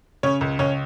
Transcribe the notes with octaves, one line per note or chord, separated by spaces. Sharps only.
C#3 C#4 C#5
C#2
C#2 C#4 C#5